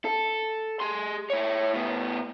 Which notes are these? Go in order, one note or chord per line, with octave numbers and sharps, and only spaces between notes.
A4
G#4 C6
E4 C#5
A2 B3